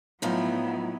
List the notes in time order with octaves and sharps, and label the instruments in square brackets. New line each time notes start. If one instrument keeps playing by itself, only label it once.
[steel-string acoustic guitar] A2 F3 D#4 [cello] F#3 [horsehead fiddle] B3 E4